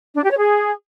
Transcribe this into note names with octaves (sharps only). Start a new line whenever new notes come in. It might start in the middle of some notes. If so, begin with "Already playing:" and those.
D4
G4
C#5
G#4